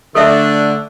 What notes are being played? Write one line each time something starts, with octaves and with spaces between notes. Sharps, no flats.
D3 A3 D4 A4 E5